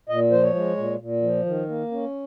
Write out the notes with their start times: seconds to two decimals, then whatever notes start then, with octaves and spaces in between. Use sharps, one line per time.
0.09 A#2 D#5
0.31 F3 C5
0.43 C#5
0.55 G#3
0.77 A#2
1.00 A#2
1.22 F3
1.46 D#3
1.68 A#3
1.92 C#4